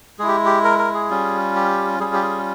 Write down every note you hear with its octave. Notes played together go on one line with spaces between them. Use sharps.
G#3 E4 G4 G#4
G4
A#4
A#4
G#4
G3 C#4 F4
G4
G3 C#4 F4 G#4
G4
G#4